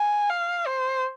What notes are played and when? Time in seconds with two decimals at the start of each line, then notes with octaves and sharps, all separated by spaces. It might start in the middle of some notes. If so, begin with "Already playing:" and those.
Already playing: G#5
0.30 F5
0.67 C5